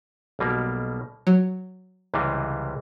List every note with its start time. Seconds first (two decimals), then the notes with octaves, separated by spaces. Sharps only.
0.39 B1 B2 G3 A#3
1.27 F#3
2.14 C#2 C3 E3 G3 C4